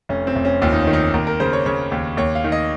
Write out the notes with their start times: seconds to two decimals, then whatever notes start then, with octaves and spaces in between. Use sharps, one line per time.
0.09 F1 C#4
0.27 C4
0.36 F1
0.45 C#4
0.62 D#2 F4
0.72 D#4
0.83 D#3 C#4
0.93 D#4
1.14 D#2 A#4
1.27 A#4
1.40 C#3 C5
1.53 C#5
1.66 C#3 C#5
1.92 D#2
2.17 D#2 C#5
2.35 F5
2.44 D#3
2.52 D#5